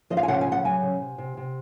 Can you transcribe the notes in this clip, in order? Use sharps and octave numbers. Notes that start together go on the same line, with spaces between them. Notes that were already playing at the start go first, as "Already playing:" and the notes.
F3 D#5
F5
G#5
C#3 F#5
G#5
C#3
F#5
F#3 G#5
C#3
C3
C3
C3